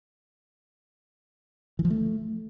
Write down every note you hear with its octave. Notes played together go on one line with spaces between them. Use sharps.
E3
F3
A3